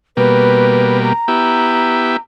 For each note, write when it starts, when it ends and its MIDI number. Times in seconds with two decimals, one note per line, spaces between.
0.17 1.13 47
0.17 1.13 55
0.17 1.13 58
0.17 1.01 71
1.03 2.20 82
1.28 2.17 59
1.28 2.17 64
1.28 2.17 67